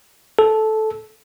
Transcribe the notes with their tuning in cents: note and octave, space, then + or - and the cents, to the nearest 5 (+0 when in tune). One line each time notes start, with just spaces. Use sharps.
A4 -10